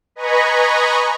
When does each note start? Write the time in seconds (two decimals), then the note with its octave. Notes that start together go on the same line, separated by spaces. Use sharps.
0.15 B4 D#5 G#5 A#5 B5 C#6